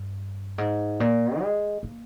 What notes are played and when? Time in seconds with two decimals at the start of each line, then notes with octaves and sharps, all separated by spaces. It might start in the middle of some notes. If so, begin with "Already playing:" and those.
Already playing: G2
0.58 G#2
1.00 A#2
1.41 G#3
1.83 A#3